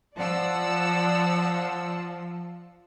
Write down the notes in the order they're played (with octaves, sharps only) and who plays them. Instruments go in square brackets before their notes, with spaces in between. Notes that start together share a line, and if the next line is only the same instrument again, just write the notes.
[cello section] F3 [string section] D5 F#5 E6 [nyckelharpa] A5